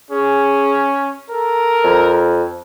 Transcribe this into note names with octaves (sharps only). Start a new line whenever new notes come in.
C#4 G#4
A4 A#4
F2